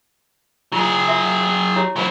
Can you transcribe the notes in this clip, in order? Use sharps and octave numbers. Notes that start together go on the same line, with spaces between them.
F#3 E4 F4 G#4
F4 F#4 E5
E4 G4 C#5
F#3 E4 F4 C5